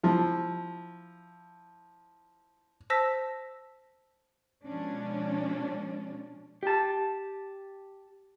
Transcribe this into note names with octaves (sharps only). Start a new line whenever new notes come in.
F3 E4
C5 A5 E6 A#6 B6
B2 F3 G#3 C#4 D4
G4 A5